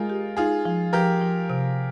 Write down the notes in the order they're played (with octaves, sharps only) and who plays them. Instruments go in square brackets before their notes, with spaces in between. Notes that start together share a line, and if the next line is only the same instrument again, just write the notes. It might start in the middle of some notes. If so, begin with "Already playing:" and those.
Already playing: [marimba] G#3 [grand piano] D#4 F4 G#4 A#4
[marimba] G4
[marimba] D#4 [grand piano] F4 G#4
[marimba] F3
[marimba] F3 [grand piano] G4 A#4
[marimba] F3
C3